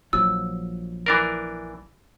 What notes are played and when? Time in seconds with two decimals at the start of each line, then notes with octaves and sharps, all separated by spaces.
0.13 A#1 F3 F#3 E6
1.06 E3 D4 A#4